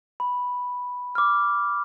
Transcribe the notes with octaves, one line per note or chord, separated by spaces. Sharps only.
B5
D6 F6